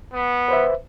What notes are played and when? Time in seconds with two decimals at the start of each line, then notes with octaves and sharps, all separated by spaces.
0.13 B3
0.49 B4 C5 E5